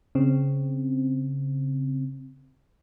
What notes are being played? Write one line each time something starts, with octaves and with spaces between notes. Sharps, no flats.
C#3 C4